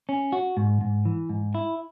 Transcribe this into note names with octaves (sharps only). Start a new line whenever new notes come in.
C#4
F#4
G#2
G#2
E3
G#2
E4